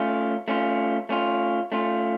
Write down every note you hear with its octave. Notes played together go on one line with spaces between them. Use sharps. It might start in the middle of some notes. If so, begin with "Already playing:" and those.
Already playing: A3 C#4 F4
A3 C#4 F4
A3 C#4 F4
A3 C#4 F4